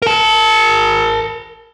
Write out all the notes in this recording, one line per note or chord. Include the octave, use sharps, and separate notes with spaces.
A#4 A5